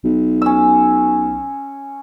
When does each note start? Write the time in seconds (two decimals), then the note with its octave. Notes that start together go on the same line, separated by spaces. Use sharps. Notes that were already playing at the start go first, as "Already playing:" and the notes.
0.05 B1
0.42 C#4 E6